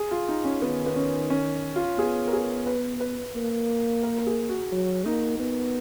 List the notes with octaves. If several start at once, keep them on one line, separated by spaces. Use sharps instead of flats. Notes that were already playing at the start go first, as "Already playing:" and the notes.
Already playing: G#4
F4
D#4
C#4
D#3 B3
B3
C#4
C#4
F4
B3 G#4
A#4
G#4
B4
B4
A#3
A#4
A#4
G#4
F#4
F#3
A#3 D#4
B3